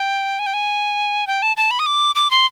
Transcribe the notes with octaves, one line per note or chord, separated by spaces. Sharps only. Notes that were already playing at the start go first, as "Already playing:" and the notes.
Already playing: G5
G#5
G5
G#5
G5
A5
A5
B5
D#6
D6
D6
C6